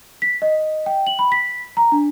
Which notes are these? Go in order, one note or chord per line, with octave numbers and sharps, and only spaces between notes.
B6
D#5
G5
F#7
B5
B6
A#5
D4